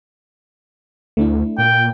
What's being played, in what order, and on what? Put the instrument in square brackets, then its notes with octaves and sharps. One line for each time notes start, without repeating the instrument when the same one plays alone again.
[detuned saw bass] D2 [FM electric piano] A3 D4 E4
[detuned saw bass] A#2 [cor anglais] G5